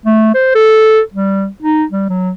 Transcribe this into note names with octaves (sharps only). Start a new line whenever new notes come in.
A3
C5
A4
G3
D#4
G3
F#3